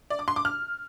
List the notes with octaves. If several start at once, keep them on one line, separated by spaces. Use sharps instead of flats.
D5
D6
C6
D6
F6